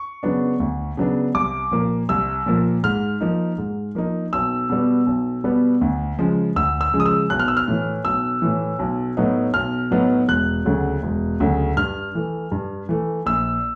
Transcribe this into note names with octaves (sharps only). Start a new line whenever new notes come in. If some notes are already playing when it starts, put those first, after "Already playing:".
Already playing: C#6
C#3 F#3 B3 D4
D2
C#3 F#3 B3 D4
C2 D6
A#2 F3 A#3
C2 E6
A#2 F3 A#3
G#2 F6
F3 A#3 D#4
G#2
F3 A#3 D#4
B1 E6
B2 G3 B3
B1
B2 G3 B3
D2
C#3 F3 G#3
D2 E6
E6
C#3 F3 G#3
D#6
E6
B1 F#6
F6
E6
F6
A2 E3
B1 E6
A2 E3
B1
A2 F#3 B3 D#4
B1 F6
A2 F#3 B3 D#4
E1 F#6
D2 C#3 F#3 A3
E1
D2 C#3 F#3 A3
G2 F6
E3 A3
G2
E3 A3
A#1 E6